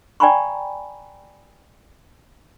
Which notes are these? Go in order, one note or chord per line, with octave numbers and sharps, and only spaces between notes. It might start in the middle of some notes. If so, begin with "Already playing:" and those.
D5 G5 G#5 A#5 B5 C#6